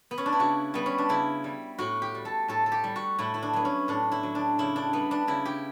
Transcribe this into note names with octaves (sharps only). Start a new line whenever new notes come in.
B3
C#4
D4
E4
C#3 F#4
G3 B3
C#4
D4
C#3 E4
G3
A2 F#4
G4
G3
A4
A2 A4
A4
G4
G3
F#4
A2 E4
E4
D4
F#3 B3
C#4
A2 D4
E4
F#3
D4
C#3 E4
D4
G3 B3
D4
C#3 E4
G4